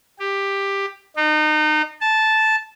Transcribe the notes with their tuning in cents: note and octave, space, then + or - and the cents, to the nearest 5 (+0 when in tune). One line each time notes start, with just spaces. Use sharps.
G4 +10
D#4 -30
A5 -10